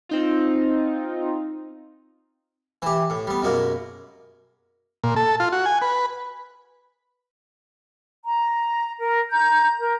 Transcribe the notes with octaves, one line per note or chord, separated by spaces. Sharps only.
C4 D#4 F4
E3 G4
A2
G3 B3
F#2 B2 G#3 A#3
A#2
A4
F4
F#4
G#5
B4
A#5
A#4
A#5 G6
A#4